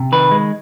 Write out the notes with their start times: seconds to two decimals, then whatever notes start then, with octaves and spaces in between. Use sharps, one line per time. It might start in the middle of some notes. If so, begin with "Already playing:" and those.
Already playing: C3
0.12 D#3 B4
0.31 G#3